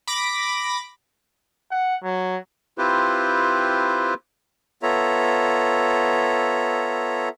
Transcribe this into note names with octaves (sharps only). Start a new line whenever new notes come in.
B5 D6 A#6
F#5
F#3
C4 E4 F4 G4 B4 C5
B3 F4 A4 C#5 E5 A#5